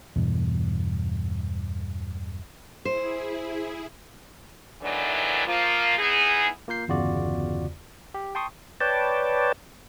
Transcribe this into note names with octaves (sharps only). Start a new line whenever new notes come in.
E2 G2 B2 E3
E4 G#4 C5
E2 A2 D#3 E3 F#3 D4
F3 A#3 F4
B3 D#4 E4 G#4
A#3 F4 A#4 G6 C7
G1 E2 C#3 F4 F#4 D5
G4
G5 A5 C6 C#6 D#6
B4 C#5 D5 G5 A5